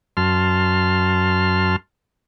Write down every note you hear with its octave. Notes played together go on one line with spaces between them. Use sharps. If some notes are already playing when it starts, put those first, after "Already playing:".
F#2 A5 C6 F6